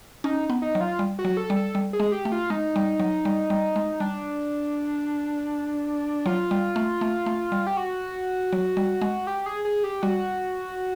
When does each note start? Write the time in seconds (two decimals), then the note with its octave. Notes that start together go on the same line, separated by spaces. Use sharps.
0.24 C#4 D#4
0.50 B3
0.62 D#4
0.75 F#3
0.81 F4
0.99 G3
1.19 F#4
1.25 F#3
1.37 A4
1.50 G3
1.56 A4
1.75 G3
1.93 G#4
2.00 G#3
2.12 G4
2.25 A3
2.32 F4
2.50 G#3 D#4
2.76 G3
3.00 F#3
3.25 G3
3.50 G3
3.76 G#3
4.00 G3 D4
6.26 F#3 F4
6.51 G3
6.76 A3
7.01 A3
7.26 A3
7.52 G3
7.67 G4
7.77 F#4
8.53 F#3
8.77 G3
9.02 G#3
9.27 G4
9.46 G#4
9.65 G#4
9.84 G4
10.02 G3 F#4